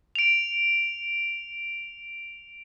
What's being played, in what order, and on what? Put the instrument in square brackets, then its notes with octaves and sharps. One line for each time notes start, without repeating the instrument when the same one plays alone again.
[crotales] D7 F7